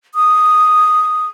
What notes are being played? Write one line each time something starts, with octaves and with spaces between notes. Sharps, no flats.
D#6